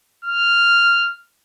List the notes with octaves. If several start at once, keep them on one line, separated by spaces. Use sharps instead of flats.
F6